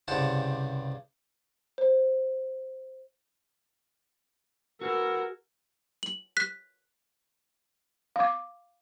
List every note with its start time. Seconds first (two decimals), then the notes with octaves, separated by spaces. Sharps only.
0.08 C2 G2 C#3 C5 F#5 A5
1.78 C5
4.81 F#4 G#4 A#4 B4 F#5 E6
6.03 F#7
6.37 F#6 B6
8.16 F5 D6